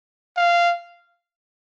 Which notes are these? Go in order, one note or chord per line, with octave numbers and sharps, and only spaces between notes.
F5